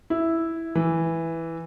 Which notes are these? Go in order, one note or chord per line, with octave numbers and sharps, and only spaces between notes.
E4
E3